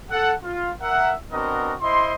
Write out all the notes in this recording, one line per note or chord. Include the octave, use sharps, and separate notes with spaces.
A4 F#5
F4
A#4 E5 F#5
B3 C4 D4 F#4 A#4 D#5
E4 C5 D#5 C6